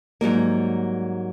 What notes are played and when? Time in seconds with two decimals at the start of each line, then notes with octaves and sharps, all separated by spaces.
0.21 G#2 F#3 G3 A#3